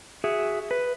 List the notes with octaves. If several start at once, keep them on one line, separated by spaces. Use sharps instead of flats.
F#4 G#4 E5
B4